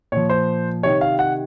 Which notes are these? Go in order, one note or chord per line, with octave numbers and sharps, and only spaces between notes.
A#2 F3 C#5
C5
C3 D#3 C#5
F5
F#5